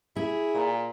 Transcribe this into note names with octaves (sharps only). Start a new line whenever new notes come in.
E4 G#4
A#2 A#5